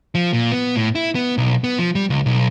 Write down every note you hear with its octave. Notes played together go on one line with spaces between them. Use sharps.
F3
A#2
B3
A2
E4
B3
B1
B3
F3
G3
C#2
B1